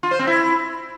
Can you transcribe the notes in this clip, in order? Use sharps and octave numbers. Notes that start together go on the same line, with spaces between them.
F4
C5
C4
E4